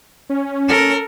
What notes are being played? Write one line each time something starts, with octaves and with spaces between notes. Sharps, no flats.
C#4
A4 A#4